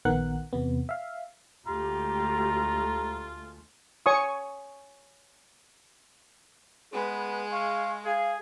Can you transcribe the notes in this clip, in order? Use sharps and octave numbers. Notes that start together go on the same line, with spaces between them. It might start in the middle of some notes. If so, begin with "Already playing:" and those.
A#1 D#3 B3 A#4 F#5 F#6
E2 C3 B3
E5 F5
D2 G#3 A3 F4 G4 A#5
C#5 G#5 C#6 D#6
G#3 B3 G#4 B4
F5 C#6
G#4 F5